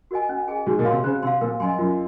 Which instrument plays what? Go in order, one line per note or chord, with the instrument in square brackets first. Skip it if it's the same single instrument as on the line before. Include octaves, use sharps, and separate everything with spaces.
[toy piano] F#4 A#4 D#5 G#5
C#4
G#4 D#5 G#5
[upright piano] G#2 [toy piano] F#4
[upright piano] A#2
[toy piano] C#5 F5 C6
[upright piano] C3
[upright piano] C#3 [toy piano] C5
[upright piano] C3 [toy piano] C6
[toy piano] F5
[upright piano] A#2 [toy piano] A#4
[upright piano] F#2 [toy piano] D#5 G#5 C6
[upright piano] F#2 [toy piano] F4